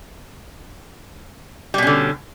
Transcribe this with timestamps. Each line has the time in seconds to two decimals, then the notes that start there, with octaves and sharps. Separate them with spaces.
1.74 G3
1.78 B2
1.82 C#4
1.87 D3